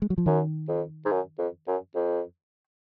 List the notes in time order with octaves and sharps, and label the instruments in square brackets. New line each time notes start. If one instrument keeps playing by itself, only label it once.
[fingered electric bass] G#3
F#3
F3
[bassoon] F#2 [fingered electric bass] D#3
[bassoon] F2
G#2
F#2
F2
F#2
F2